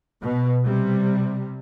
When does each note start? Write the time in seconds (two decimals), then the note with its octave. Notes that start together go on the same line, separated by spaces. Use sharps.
0.22 B2
0.65 C3 G3